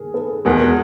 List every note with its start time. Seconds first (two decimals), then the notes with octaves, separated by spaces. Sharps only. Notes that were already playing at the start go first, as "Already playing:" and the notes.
Already playing: G#4 A#4
0.14 A4 B4
0.45 E2 B2 G#3 G#4 A#4